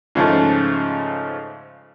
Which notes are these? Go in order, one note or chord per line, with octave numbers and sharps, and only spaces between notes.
G#2 C#3 F3 A3